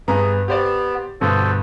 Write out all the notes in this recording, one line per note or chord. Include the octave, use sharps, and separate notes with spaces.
G2 B3 G#4 A#5
B3 G4 C5 D5
G2 B2 D3 F#4 A4 C5